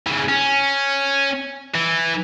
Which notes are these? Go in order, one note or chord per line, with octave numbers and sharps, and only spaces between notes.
C#3 E3
C#4
E3